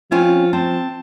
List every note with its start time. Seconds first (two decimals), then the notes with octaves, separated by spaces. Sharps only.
0.12 F3 C4 C#4 F4 G#5
0.53 C4 A5